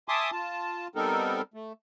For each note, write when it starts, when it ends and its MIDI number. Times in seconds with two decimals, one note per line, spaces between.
0.09 0.31 76
0.09 0.31 80
0.09 0.31 81
0.09 0.31 84
0.09 0.31 86
0.09 0.31 87
0.32 0.88 65
0.32 0.88 81
0.95 1.42 55
0.95 1.42 59
0.95 1.42 60
0.95 1.42 63
0.95 1.42 69
0.95 1.42 70
1.54 1.73 57